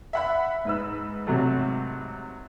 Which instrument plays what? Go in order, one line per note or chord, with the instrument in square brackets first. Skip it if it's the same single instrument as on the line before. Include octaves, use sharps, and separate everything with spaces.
[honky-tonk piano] E5 F#5 B5
G#2 B4 E6
[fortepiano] C3 F#3 A3